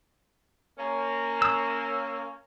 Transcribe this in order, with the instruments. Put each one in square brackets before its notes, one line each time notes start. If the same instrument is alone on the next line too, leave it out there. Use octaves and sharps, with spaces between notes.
[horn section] A#3 C#4
[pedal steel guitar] E6